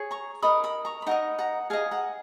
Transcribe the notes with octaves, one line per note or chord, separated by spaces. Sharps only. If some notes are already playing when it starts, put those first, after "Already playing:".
Already playing: G#4 C#5
A#5 C#6
D#4 A#4 D#5 B5 D#6
B5 D#6
A#5 C#6
B5
D#4 A#4 D#5 F#5 A#5
F#5 A#5
G#4 D#5 F5 G#5
F#5 A#5